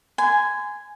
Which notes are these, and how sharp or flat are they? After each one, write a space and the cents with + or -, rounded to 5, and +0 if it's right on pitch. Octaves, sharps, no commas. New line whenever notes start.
G#5 +0 C6 -35